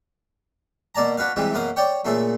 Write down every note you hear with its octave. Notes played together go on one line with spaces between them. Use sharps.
B2 A#3 D5 A5 A#5
D4 F#4 B4 F5
C3 E3 G3 G#3
F#2 B2 A#3 F5 D#6
C#5 D5 G5 C#6
A#2 C#3 A3 A4